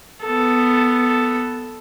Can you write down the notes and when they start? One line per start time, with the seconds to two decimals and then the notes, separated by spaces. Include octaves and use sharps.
0.24 B3 A4